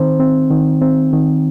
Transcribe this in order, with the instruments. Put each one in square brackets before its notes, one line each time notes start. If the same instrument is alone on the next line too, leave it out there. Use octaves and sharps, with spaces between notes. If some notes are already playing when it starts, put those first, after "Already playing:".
Already playing: [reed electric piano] D#3 C4 C5
C4
D#3
C4
D#3